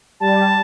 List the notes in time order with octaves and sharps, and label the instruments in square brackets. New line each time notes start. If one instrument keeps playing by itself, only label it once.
[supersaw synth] G3 [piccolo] A5